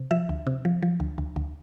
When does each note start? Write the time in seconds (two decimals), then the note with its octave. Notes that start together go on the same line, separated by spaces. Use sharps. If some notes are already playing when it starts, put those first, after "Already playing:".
Already playing: C3
0.11 F3 E5
0.29 D2
0.47 C3
0.65 F3
0.82 F3
1.00 D2
1.18 D2
1.36 D2